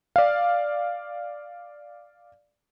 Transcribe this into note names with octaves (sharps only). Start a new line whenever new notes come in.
D5 F5